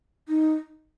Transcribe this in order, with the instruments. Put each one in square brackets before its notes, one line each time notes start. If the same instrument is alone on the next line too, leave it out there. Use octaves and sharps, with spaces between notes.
[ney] D#4